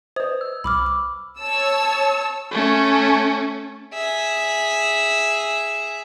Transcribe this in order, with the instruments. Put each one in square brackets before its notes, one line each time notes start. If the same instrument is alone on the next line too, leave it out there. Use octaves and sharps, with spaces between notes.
[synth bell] B4 C5 [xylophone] D#6
[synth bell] E6
[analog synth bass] C2 [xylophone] B5 D6 F6
[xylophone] D6
[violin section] C#5 A5 E6
[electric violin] A3 C#4
[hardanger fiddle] G#4 E5